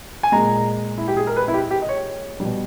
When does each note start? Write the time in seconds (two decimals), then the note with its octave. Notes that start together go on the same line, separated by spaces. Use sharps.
0.23 G#5
0.32 A#2 G#3 A#5
0.98 E4
1.08 G4
1.17 G#4
1.27 A#4
1.36 B4
1.48 E4
1.54 G4
1.71 G4
1.82 D#5
1.89 C#5
2.40 B2 G3